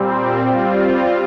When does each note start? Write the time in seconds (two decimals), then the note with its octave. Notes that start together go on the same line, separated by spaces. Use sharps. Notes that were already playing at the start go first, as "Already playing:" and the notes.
Already playing: A#2 G3 C4
0.48 G3 C4 F4